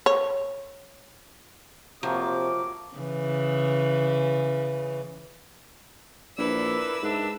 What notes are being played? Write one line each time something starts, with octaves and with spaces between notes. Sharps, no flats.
C#5
C3 F3 F#3 A3 A#3 D6
C#3 E3
A#1 E2 D4 E4 A#4 B4 E6
G#2 D4 E5